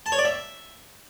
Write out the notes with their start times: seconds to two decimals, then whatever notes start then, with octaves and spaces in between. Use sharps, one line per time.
0.06 A5
0.12 C#5
0.18 D5
0.25 E5